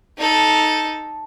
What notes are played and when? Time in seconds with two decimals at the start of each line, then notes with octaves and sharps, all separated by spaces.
0.18 D#4 A4